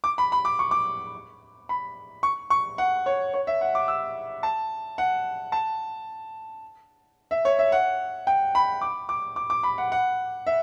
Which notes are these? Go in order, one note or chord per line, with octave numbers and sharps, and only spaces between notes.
D6
B5
B5
D6
C#6
D6
B5
C#6
C#6
F#5
C#5
C#5
E5
F#5
D6
E6
A5
F#5
A5
E5
C#5
E5
F#5
G5
B5
D6
D6
D6
D6
B5
F#5
F#5
E5